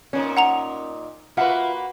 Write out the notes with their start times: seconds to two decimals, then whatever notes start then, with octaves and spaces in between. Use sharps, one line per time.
0.13 A#2 A#3 C#4 D#4
0.37 F#5 A#5 F7
1.37 A#3 F4 F#4 B4 E5 F#5